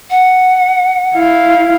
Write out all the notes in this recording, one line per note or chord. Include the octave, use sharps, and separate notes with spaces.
F#5
E4 F5